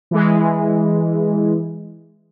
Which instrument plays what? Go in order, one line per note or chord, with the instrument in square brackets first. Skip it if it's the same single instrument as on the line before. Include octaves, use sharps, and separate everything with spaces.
[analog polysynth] E3 G#3